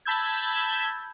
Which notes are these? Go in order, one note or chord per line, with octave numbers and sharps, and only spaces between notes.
A5 B5 E6 G6 G#6